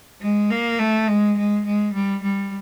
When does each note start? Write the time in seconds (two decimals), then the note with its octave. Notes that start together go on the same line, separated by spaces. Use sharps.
0.21 G#3
0.51 A#3
0.79 A3
1.08 G#3
1.37 G#3
1.66 G#3
1.94 G3
2.23 G3